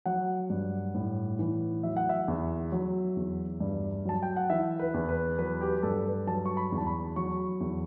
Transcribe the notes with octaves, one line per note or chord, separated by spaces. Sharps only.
F#3 F#5
G2
A2
E3
F#3 E5
F#5
E5
E2
F#3
E2
G2
F#3 A5
G5
F#5
E3 E5
B4
E2
B4
F#3 B4
G4
G2 A4
B4
F#3 A5
C#6
B5
E2
A5
B5
F#3 C#6
E2